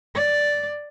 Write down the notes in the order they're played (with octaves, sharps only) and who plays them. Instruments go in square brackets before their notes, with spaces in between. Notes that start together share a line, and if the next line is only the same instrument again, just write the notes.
[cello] D5